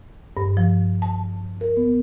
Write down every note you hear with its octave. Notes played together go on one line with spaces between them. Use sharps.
G2
F3
A5
A#4
B3